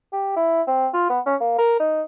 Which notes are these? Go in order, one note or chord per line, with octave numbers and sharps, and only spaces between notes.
G4
E4
C4
F4
B3
C#4
A#3
A#4
D#4